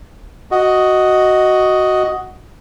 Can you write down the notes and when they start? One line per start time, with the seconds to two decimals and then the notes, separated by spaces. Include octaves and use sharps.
0.51 F#4 D#5